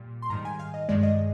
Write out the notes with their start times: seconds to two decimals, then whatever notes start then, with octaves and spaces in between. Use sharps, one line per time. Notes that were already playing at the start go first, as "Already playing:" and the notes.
Already playing: A#2 G3
0.22 C6
0.30 G#2 D#3 G3 A#5
0.45 G#5
0.59 F5
0.74 D#5
0.89 G2 D#3 G#3 D5
1.03 D#5